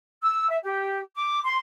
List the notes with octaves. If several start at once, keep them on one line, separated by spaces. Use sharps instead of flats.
E6
E5
G4
D6
C6